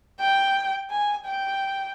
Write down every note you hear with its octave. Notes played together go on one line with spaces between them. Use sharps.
G5
G#5
G5